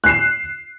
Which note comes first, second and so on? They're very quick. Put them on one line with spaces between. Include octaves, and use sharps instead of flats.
F#6 C7 E7